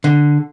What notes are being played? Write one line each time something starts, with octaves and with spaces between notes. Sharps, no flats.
D3